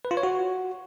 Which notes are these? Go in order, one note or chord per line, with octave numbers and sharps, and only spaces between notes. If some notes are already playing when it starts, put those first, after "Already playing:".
B4
F4
C#5
F#4